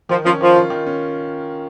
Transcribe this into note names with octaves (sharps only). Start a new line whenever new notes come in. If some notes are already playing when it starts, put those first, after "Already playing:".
D#3 F3
F3 C#4
D#3 F3
F4
D#3
C#4